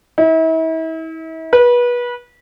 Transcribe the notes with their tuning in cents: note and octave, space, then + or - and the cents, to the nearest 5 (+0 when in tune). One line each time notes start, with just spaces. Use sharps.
E4 -40
B4 -25